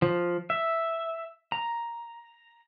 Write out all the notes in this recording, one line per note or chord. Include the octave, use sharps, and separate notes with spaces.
F3
E5
A#5